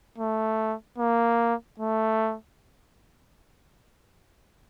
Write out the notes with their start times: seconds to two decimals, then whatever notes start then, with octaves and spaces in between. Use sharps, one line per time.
0.18 A3
0.98 A#3
1.79 A3